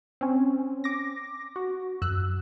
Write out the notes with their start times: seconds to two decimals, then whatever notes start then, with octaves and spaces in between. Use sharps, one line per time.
0.21 C4 C#4
0.84 D6 A#6
1.56 F#4
2.02 F#2 E6 F#6